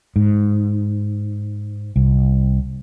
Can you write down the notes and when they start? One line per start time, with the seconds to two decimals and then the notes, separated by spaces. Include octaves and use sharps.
0.16 G#2
1.96 C2